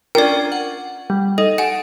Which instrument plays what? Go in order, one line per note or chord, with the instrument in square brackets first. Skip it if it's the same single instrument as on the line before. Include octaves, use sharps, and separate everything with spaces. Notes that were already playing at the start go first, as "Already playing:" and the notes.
[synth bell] C#4 D4 F4 [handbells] A#4 [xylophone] D5 G5
[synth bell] F#5
[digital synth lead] G3
[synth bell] D#4 [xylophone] A4 [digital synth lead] D#5
[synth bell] A4 [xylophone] F#5 G#5 [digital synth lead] D7